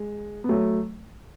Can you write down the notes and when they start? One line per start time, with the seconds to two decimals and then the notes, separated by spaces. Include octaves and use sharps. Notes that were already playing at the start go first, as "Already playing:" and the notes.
Already playing: G#3
0.44 B3
0.49 F#3 A3